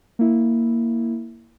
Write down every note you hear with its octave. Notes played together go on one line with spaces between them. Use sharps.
A#3 E4